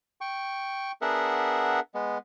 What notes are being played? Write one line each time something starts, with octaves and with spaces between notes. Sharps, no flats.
G5 C#6
B3 D4 G#4 A#4 E5 F#5
G#3 B3